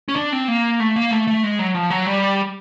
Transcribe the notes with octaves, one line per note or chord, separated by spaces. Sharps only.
C#4
D4
C4
A#3
A3
A#3
A3
A3
G#3
F#3
F3
F#3
G3